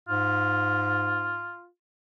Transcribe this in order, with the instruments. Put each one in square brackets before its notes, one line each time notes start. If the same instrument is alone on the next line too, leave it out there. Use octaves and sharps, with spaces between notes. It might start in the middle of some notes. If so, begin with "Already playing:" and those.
[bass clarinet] G#2 [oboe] F4